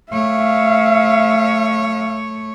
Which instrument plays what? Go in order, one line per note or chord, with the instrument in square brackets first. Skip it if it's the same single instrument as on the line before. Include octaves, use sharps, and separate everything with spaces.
[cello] A3 C#5 [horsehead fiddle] E5 F5